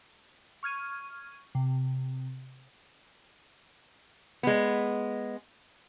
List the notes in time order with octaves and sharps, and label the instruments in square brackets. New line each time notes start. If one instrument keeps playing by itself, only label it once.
[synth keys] C#6 F6 G#6 D#7
C3
[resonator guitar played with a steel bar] G#3 B3